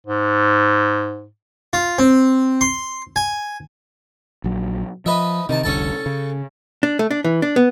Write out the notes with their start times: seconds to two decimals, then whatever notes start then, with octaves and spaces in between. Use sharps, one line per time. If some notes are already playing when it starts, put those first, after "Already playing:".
0.07 G#2
1.73 F4
1.99 C4
2.61 C6
3.16 G#5
4.44 A#1 F#3
5.06 F3 B4 D#5 E5
5.49 C3 D#3 A5
5.64 F1 C2 D3 C#4 A4 A5
6.06 C#3
6.83 D4
6.99 A3
7.11 D4
7.24 E3
7.42 D4
7.56 B3